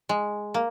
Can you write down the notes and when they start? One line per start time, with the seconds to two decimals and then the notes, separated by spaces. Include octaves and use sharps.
0.09 G#3
0.54 A#3